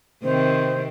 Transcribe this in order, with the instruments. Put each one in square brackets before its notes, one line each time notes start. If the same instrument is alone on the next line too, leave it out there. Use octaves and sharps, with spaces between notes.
[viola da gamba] C3 D#3 C4 [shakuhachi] C5